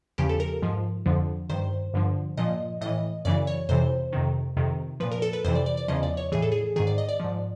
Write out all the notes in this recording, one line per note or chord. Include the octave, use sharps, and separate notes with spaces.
E2 C#3 F3 G4
A4
A#4
G#2 F3
F2 D3 F3
G2 D#3 C5
G2 D3 F3
A#2 F3 D#5
A2 E3 D#5
F#2 C#3 E3 D5
C#5
F2 C3 E3 C5
F2 C3 D#3
F2 C3 D#3
A#2 F3 B4
A#4
A4
B4
F2 C3 E3 C5
D5
D5
D5
E2 C#3 F3 D#5
D5
C#5
A2 E3 G#4
A4
G#4
G#2 D#3 G#4
D5
D#5
D5
G#2 F3